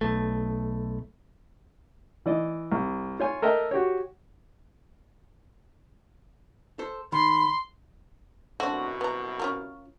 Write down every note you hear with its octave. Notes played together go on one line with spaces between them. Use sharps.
B1 A3
E3 D5 D#5
C2
F4 C#5 G#5
A4 A#4 D#5 E5 G5
F#4 G4 C#5
A4 C5
D#3 B5 C6
C2 F#2 B2 A3 C4 D4 F#4
B3 A#5
C#4 F4 A#4